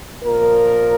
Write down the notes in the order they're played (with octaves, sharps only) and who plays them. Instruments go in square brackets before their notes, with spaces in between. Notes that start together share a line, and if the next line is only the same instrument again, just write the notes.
[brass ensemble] A#2 F3 A#4